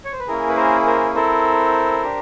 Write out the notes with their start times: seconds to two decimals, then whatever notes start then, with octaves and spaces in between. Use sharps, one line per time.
0.05 C#5
0.12 C5
0.20 B4
0.27 A#3 C#4 E4 G#4 A#4
0.49 B4
0.56 A#4 C5
0.86 A#4 C5
1.15 C4 E4 A4 A#4 C5
2.03 D4 G4